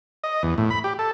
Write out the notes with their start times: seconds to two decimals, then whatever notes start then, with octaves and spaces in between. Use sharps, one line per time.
0.24 D#5
0.43 E2
0.58 A2
0.70 B5
0.84 G4
0.99 A4